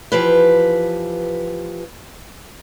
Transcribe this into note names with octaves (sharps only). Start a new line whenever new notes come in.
E3 F3 G4 B4